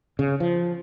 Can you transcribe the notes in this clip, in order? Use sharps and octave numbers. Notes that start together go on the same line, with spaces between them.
C#3
F3